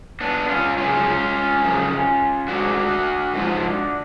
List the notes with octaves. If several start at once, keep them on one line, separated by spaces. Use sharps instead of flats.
B3 D4
C#4 F4
F#2 C#3 F3 C#4 F4
F#2 C#3 F3
G#2 F3 D4 F#4
G#2 F3